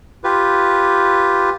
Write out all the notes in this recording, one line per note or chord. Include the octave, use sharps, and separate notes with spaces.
F4 G4 B4